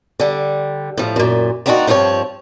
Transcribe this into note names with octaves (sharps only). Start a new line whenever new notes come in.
D3 G3
A2 F3
F#2 A#2
A#3 C4 D4 D#4 F4 F#4
G2 F3 C4 G4 C#5